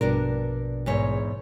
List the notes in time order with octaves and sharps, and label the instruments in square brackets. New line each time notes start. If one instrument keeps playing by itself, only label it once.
[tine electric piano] A#1 B2 [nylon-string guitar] G2 D4 A#4
[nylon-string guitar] E2 G#2 C#5